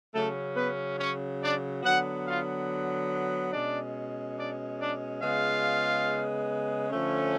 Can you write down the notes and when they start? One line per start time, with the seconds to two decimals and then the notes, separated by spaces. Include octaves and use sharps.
0.14 C#3 F#3 A3 C#4 A4
0.56 B3 B4
0.99 C#4 C#5
1.41 D4 D5
1.83 D3 F#3 B3 F#4 F#5
2.26 F4 F5
3.52 B2 G#3 C#4 D4 D5
4.37 D4 D5
4.80 D4 D5
5.22 C#3 G#3 B3 F4 F5
6.91 D3 F3 A3 C#4